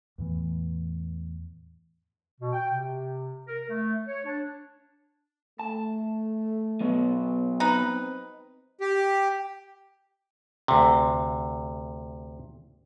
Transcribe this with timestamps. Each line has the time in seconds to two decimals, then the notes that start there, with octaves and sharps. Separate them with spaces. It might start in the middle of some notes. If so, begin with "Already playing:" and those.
0.18 E2 A2 E3
2.40 B2
2.53 G5
2.71 C3
3.47 A#4
3.68 A3
4.07 C#5
4.25 D4
5.59 A3 A5
6.80 F#3 B3
7.60 C4 D#4 B4
8.81 G4
10.68 D2 C3